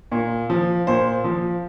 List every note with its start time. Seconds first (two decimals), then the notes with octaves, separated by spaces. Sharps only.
0.12 A#2
0.50 F3
0.87 A#2 C5
1.24 F3